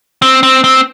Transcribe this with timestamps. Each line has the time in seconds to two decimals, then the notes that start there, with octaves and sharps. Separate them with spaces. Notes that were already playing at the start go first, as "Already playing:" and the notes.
0.22 C4
0.43 C4
0.64 C4